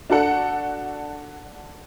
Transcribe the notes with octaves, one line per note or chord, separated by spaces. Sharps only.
D4 F#4 A4 F#5